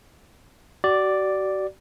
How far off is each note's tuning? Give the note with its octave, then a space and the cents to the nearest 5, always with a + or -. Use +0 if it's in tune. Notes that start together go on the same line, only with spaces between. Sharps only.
F#4 +40 D5 +0